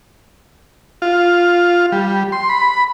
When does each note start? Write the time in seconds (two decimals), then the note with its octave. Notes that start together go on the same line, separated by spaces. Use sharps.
1.02 F4
1.92 G3
2.32 C6
2.49 B5